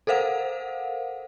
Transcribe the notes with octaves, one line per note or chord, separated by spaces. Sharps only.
A4 A#4 C5 F5 F#5